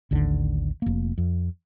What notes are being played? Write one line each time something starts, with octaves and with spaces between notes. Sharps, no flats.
A1 D#2 D3
F1 A#3
F2